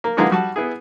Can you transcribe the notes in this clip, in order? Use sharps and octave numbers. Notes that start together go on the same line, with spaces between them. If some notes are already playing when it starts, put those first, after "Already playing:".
A#3
D3 E3 G#3 A#3 F4 F#4
G3 F#4 A5
B3 E4 G#4